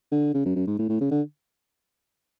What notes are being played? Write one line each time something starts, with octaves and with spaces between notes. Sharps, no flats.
D3
C#3
F#2
F#2
G#2
A2
A2
C#3
D3